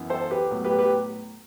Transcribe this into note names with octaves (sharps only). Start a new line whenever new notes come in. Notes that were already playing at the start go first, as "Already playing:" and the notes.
Already playing: F#2 E3 B3
A4 C5
G4 B4
A2 F#3 B3
G4 B4
G4 B4